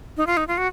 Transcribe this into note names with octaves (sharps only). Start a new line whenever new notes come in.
D#4
F4
D#4
F4
F#4